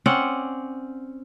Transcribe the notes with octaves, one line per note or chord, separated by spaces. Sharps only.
C4 C#4 D5 F#5